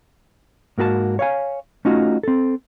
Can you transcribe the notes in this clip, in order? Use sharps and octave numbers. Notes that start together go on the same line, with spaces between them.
G#2 A#3 F#4 G4 A5
C#5 F5 G#5
A3 C#4 D#4 F4 F#4
C4 A4